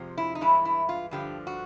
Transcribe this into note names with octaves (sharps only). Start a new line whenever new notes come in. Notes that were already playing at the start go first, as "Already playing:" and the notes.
Already playing: F2 C3 F3 G#3
E4
D#4
G2 E3 G#3 E4
E4
F4
G2 D3 F3 G4
F#4